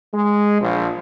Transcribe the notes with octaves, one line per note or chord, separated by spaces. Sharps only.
G#3
A#1